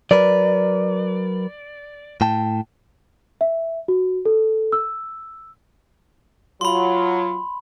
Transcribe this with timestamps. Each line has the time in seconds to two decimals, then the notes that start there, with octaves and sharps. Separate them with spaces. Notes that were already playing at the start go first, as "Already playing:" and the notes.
0.11 F#3 A#4 B4 D5
2.21 A2 G5 A5
3.41 E5
3.88 F#4
4.26 A4
4.72 E6
6.61 F#3 F4 B5 C6